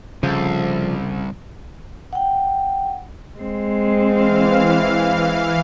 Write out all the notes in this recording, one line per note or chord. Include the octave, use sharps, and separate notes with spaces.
C2 C#3 F3 A4
F#5 G5
G#3 C4
E3 F5